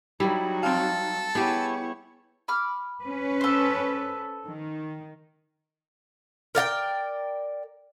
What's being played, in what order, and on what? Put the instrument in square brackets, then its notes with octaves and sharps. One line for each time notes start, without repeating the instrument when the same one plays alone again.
[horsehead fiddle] F#3 D#4 [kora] G3 E4
[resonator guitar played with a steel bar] C4 F5 [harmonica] A4
[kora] B3 G4 [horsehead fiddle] E4 C#5 [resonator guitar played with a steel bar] G#4
[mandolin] B5 D6 F6
[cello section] C#4 B4
[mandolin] A4 C5
[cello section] D#3
[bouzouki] A#4 D5 F5 G5